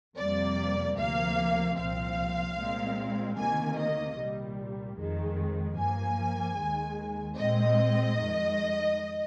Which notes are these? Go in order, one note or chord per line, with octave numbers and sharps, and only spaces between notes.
F2 C3 G3 A#3 D5
D2 C3 F3 A#3 F5
C2 A#2 F3 C4 F5
A#2 G#3 C4
D2 C3 D#3 A#3 G#5
D#5
C2 A#2 G3
F2 D#3 G#3
G2 F3 A#3 G#5
D#2 D#3 G#3
A#2 G#3 C4 D#5
F2 D#3 G#3